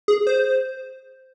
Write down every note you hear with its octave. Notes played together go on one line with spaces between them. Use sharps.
G#4
C5